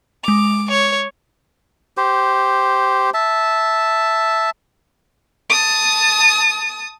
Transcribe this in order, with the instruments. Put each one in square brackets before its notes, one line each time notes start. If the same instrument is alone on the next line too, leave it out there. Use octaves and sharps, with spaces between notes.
[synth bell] G#3 F7 [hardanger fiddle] D6
[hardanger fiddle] C#5 [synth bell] F7
[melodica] G4 C5
E5 A5
[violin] A5 D#6